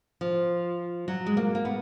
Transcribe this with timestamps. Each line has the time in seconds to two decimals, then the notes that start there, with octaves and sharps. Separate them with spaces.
0.21 F3
1.08 F#3
1.26 G#3
1.37 A#3
1.55 A#3
1.65 B3